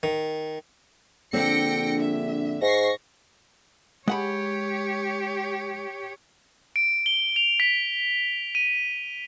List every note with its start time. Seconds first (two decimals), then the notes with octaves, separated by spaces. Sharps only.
0.03 D#3
1.33 A#1 D3 C4 D4 G5 A#6 C#7
1.99 E5
2.61 G#2 C#6 A#6 C7
4.08 G#3 G4 C#5 F#5 B5
6.76 D7
7.06 G7
7.36 F7
7.60 B6
8.55 D#7